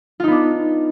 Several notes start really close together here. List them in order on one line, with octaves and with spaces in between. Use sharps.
F4 D#4 B3 D4